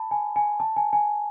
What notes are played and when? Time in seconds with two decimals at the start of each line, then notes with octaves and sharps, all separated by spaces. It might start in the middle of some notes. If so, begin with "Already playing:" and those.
Already playing: A5 B5
0.11 G#5
0.36 G#5
0.60 A5
0.76 G#5
0.93 G#5